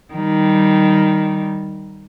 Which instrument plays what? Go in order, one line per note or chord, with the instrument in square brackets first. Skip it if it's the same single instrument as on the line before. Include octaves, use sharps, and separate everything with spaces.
[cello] D#3 G3